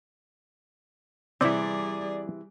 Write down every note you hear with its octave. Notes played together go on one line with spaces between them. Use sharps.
C3 E3 G3 C4 E4 G#4 D5 D6